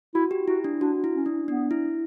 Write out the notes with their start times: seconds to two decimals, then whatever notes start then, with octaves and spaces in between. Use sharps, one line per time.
0.15 E4 F#4
0.31 G4
0.48 E4 F#4
0.64 D4
0.81 D4 F#4
1.04 E4
1.16 C#4
1.26 D4
1.48 B3 D4
1.71 E4